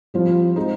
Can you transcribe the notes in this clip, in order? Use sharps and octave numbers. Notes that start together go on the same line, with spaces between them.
F3 G3 C4 F4
G#3 C4 D#4